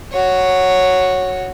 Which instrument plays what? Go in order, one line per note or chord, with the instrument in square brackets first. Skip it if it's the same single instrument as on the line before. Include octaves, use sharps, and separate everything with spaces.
[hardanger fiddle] F#4 C#5